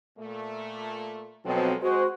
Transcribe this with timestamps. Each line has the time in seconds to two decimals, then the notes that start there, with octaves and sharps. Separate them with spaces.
0.18 A#2 A3
1.45 B2 F3 F#3 G#3 C4 A4
1.82 G#3 F#4 C5